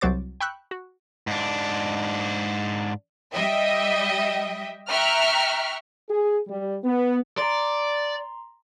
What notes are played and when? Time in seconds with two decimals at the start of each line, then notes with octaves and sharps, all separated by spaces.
0.01 C2 F#3 F#4 C5 D6 A6
0.41 G5 B5 C#6 E6 F#6 G6
0.71 F#4
1.27 G#2 D4
3.33 G3 D#5 E5 G5
4.89 E5 G5 A#5 C#6 F6 F#6
6.10 G#4
6.47 G3
6.83 B3
7.38 D5 A#5 C6